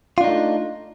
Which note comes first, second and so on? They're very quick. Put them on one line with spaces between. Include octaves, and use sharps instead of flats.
F4 D4 D#4 A3